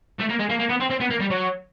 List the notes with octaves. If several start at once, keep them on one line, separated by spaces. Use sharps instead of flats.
A3
A#3
G#3
A#3
A#3
B3
C4
C4
B3
A#3
G3
F#3